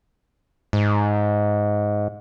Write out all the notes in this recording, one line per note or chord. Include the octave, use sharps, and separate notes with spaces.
G#2